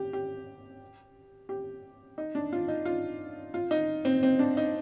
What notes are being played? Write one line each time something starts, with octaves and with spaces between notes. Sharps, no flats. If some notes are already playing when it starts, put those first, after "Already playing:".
Already playing: G4
G4
G4
D#4
D4
F4
D#4
F4
F4
D#4
C4
C4
D4
D#4